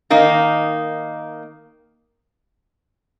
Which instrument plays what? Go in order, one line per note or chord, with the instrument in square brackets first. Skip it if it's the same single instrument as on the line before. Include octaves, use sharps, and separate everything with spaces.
[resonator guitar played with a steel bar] D#3 A#3 D#4